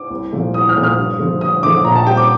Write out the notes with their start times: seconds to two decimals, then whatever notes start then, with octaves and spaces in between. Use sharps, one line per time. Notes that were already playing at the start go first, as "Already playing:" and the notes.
Already playing: D6
0.11 C2
0.33 A#2 F3 A3
0.54 C2 D#6
0.69 F6
0.76 A#2 F3 A3
0.83 F6
0.98 G2
1.19 D3 F3 A3
1.41 G2 D#6
1.63 D3 F3 A3 D6
1.85 A#2 A#5
1.95 A5
2.07 G3 C4 G5
2.17 D6